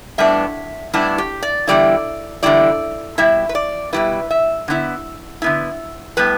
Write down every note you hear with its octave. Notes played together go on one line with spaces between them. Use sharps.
A2 G3 B3 D4 E5
A2 G3 B3 D4 E4
G4
D5
E2 D3 G3 E4 D5
E2 D3 G3 E4 D5
B2 G3 E4 E5
B4
D5
B2 G3 E4 B4
E5
D3 B3 E4
D3 B3 E4
A2 G3 B3 B4